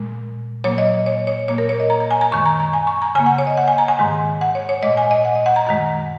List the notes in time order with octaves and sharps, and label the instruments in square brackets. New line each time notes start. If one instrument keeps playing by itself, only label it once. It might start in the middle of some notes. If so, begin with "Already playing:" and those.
Already playing: [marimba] A#2 G#3
A#2 F#3 A#3 C#5
D#5
C#5
C#5
A#2 A#3 C#5
A#4
C#5
D#5
A#5
A#5
G#5
A#5
F#2 D#3 G#3 C#6
A#5
A#5
G#5
C#6
A#5
C#3 G#5
A#3
F#5
C#5
D#5
F#5
G#5
A#5
G#5
G#2 D#3 G#3
F#5
C#5
C#5
A#2 G#3 D#5
G#5
D#5
F#5
D#5
F#5
A#5
F#2 D#3 G#3 A#5